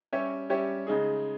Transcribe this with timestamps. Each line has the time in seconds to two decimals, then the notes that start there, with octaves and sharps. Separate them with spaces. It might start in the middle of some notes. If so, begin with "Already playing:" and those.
0.13 G3 C#4 G4 C#5 E5
0.50 G3 C#4 G4 C#5 E5
0.87 C#3 G#3 D#4 G#4